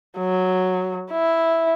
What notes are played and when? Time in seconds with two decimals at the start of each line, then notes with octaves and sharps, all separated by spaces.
0.18 F#3
1.12 E4